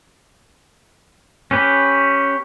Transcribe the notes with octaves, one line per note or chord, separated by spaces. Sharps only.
C#4 G4 B4